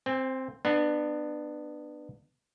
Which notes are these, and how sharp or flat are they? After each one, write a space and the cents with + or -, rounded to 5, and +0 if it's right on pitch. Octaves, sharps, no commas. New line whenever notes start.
C4 +0 G5 +45
B3 +0 D4 +25